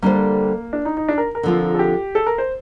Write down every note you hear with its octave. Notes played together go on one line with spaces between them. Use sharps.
D3 G3 A#3 D4 A4 C5
D4
D#4
D#4
D4
A#4
A#4
D3 F3 C4 F4
A4
G4
A4
A#4
C5